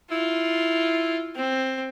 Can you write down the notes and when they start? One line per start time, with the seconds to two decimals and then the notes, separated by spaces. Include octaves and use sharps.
0.11 E4 F4
1.36 C4